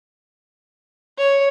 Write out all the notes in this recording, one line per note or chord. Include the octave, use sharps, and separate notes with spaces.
C#5